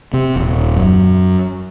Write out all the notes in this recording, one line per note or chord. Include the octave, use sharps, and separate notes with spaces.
C3
D#1
F#2